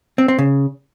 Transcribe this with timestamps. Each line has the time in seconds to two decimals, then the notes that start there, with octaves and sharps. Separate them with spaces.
0.18 C4
0.28 C4
0.38 C#3